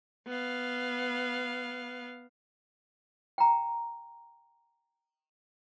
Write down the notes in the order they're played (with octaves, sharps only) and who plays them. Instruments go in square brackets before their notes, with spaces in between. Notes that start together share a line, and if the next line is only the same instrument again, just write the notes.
[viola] B3 F5
[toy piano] G5 A#5